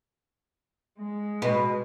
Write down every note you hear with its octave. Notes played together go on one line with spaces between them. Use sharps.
G#3
B2